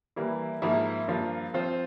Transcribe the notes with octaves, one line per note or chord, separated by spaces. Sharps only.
E3 G3 A#3 E4
G#2 F3 A#3 E4
G2 F3 A#3 F4
F3 C4 F4 C5